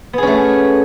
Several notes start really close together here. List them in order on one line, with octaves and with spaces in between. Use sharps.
B3 G#4 C#4 A3